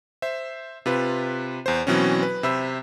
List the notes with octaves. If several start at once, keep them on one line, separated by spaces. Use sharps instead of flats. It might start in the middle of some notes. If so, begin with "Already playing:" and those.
C5 E5
C3 F4 B4
E2 C5
B2 E3 F#3 C4 C#4
B4
C3 C5 E5 B5 E6